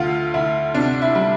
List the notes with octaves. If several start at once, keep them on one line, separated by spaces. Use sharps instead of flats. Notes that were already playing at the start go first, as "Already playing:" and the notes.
Already playing: D2 F4
D2 E4
C3 D4
E4
G3